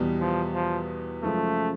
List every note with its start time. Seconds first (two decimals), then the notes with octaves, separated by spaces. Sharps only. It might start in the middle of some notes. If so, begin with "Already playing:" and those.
Already playing: E2 B2 G3
0.21 F3
0.55 F3
1.23 F#2 C#3 F3 G#3 A3